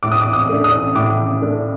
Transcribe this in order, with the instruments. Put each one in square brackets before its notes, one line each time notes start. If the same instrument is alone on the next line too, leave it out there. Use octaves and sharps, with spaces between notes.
[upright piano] A2 D6
D#6
D6
D#6
A3 D4
D#6
A2 D6
A3 D4